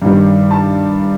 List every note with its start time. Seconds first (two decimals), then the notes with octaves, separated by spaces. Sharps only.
0.02 G2 D#3 G3
0.51 A5